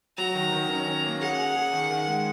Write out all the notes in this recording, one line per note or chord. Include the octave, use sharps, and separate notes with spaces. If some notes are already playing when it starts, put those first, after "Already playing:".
F#3 A#5
D#3
D#3
C#4
C#4
A#3
G#4 F#5
G#4
G#4
D#3
D#3
G#3